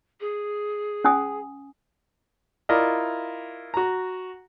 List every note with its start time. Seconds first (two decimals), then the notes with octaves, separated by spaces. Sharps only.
0.20 G#4
1.04 C#4 G#5 D#6
2.69 E4 F4 A#4 D5 D#5
3.74 F#4 A#5